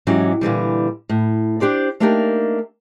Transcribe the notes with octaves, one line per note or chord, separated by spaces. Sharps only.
G#2 E3 F#3 C#4 G4
A#2 D3 E3 G3
A2
D4 G4 C5 D5
A3 A#3 D4 D#4 G4 A#4